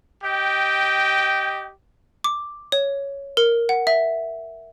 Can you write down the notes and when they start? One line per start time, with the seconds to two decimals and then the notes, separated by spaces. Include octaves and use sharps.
0.23 G4 D#5 G5
2.24 D6
2.72 C#5
3.37 A#4
3.69 F#5
3.87 E5